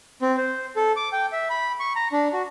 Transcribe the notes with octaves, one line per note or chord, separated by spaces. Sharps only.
C4
C5
A4
D6
G5
E5
B5
C#6
A#5
D4
F#4